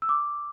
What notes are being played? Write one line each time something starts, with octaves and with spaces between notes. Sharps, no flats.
E6
D6